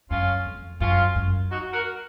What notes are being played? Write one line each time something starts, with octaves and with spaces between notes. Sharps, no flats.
F#2 C#4 F4
F2
F#2 C#4 F4
F#2
D#4 F#4
F#4 A#4